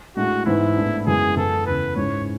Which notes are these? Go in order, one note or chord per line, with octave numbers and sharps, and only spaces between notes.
A2 G#3 D4 F#4
G#2 E3 B3 E4
A2 G#3 B3 D4
F#2 E3 G#3 B3 G#4
F#2 E3 B3 A4
E2 C#3 E3 B3 B4
G#2 G#3 C#4 E4 C#5